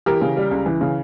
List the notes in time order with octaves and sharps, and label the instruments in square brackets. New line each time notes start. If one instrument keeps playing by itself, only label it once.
[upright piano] E3 G4 A#4
C#3
G3
C#2
E3
C#3